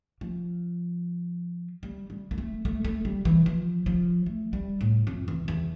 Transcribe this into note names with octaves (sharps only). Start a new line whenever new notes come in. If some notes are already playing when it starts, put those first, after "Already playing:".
F3
G3
G3
A#3
A3
A3
A3
G3
E3
F3
F3
A3
G3
A2
F2
E2
E2